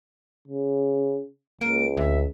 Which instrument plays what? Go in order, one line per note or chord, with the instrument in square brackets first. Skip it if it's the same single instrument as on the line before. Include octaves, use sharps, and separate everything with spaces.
[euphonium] C#3
[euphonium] C#2 [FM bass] A#3 [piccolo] D7
[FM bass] D2 [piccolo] E5